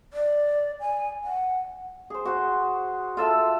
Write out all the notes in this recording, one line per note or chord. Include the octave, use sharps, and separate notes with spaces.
D5
G#5
F#5
G#4 C5
F#4 C5
F4 A4 E5